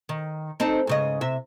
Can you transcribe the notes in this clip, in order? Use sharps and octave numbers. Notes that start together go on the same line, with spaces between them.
D#3
C4 D#4 A4
G#2 C#3 D#5
C3 E5